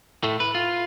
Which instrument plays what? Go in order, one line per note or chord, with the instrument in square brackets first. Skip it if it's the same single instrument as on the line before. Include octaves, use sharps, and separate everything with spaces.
[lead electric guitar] A2 A3
B4
F4